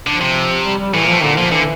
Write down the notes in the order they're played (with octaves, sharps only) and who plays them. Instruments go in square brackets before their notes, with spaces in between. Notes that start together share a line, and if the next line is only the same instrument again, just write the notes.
[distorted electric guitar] D3 [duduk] F3
[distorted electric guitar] C3
[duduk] G3
G3
[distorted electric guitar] A2 [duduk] E3
[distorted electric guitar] A#2 [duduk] F3
[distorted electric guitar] A2
[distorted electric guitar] A#2 [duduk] D3
[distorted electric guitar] A#2 [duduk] F3
[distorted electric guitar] D3 [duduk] E3